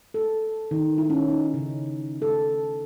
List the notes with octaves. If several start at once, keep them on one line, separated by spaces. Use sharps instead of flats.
A4
D#3
E4
C#4
D#4
C#3
A4